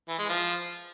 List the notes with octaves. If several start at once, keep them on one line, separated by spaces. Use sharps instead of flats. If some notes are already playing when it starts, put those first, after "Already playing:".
E3
G#3
F3